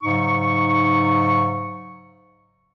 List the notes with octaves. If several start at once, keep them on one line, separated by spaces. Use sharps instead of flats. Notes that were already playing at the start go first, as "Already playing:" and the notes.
G#2 C#3 F#3 D#4 C#6